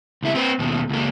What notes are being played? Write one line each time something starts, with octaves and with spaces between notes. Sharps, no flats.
C#2 E4
C4 B4
D#2 B2
C#2 A#3